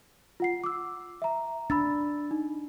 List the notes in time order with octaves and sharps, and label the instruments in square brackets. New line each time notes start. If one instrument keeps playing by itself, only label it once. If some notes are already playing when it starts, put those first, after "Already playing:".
[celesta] F4 F#5 C7
D6 E6
E5 A#5
[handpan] D4 [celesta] B5 E6 A6
[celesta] D#4